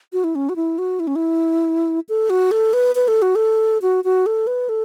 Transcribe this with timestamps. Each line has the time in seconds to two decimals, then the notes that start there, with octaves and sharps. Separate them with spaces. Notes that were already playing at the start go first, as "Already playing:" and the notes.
0.13 F#4
0.24 E4
0.35 C#4
0.49 F#4
0.56 E4
0.78 F#4
1.00 E4
1.07 C#4
1.16 E4
2.09 A4
2.30 F#4
2.51 A4
2.73 B4
2.95 B4
3.08 A4
3.22 F#4
3.35 A4
3.82 F#4
4.04 F#4
4.26 A4
4.47 B4
4.69 A4